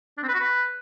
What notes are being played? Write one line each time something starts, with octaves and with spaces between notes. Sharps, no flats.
D4
C4
B4
F#4
B4